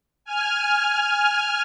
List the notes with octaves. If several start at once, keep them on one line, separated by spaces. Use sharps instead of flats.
G#5 F6